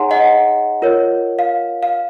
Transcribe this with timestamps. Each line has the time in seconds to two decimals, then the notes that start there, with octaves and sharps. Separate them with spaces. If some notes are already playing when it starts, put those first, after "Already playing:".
Already playing: D#4 G#4 C#5 F#5 G#5 A#5 C6
0.11 D#5 F#5
0.82 F4 A#4 C#5
1.39 F5
1.83 F5